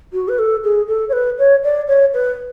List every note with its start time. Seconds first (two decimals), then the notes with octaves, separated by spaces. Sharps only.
0.13 F#4
0.28 B4
0.39 A4
0.64 G#4
0.88 A4
1.09 C#5
1.13 B4
1.38 C#5
1.64 D5
1.88 C#5
2.13 B4